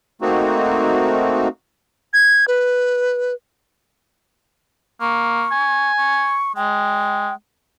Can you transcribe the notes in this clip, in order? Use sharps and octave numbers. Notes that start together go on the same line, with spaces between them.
A3 A#3 C4 D#4 F#4
G#6
B4
A#3 C#6
G#5
C#6
G#3 G5